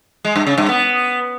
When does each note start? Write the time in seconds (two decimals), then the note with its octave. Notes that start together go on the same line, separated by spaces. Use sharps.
0.25 G#3
0.36 G2
0.47 C#3
0.58 G2
0.69 B3